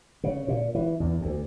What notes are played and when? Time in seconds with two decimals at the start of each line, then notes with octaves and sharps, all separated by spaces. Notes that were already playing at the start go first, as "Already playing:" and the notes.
0.24 C#3
0.48 A#2
0.75 E3
1.00 E2
1.21 D2